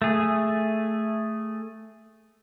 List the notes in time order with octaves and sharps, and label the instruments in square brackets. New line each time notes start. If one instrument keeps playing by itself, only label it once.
[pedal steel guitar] A3 G#4